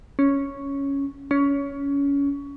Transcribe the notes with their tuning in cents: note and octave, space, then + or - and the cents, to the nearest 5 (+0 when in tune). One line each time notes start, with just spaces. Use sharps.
C#4 +0
C#4 +20